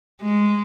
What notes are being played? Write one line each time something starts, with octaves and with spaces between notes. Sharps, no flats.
G#3